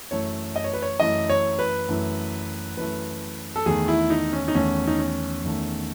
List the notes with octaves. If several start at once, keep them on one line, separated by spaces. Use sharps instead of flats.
F#2 E3 A3 C#5
D#5
C#5
B4
C#5
F#2 E3 A3 D#5
C#5
B4
F#2 E3 A3
F#2 E3 A3 B4
A4
E2 D#3 A3 G#4
E4
D#4
C#4
D#4
E2 D#3 A3 C#4
D#4
C#4
E2 D#3 A3